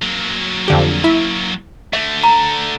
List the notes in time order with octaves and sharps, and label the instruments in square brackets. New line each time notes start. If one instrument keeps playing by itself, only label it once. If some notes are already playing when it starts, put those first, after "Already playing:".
[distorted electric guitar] F#3 A#3
[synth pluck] F2 D3 G4
E4
[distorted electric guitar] D3 A3 [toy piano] E5
[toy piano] A#5